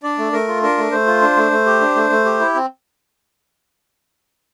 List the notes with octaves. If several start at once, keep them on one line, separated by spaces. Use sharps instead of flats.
D4 D5
A3
A3 A#4
F4
D4 A#4
A3
A3 C5
F4
D4
A3
A3
G4
D4
A3
A3
G4
E4
C4